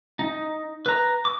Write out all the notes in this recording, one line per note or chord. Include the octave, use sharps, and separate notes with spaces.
D#4
B4 A#5
D6